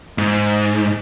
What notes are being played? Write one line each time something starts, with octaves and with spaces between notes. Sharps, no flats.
G#2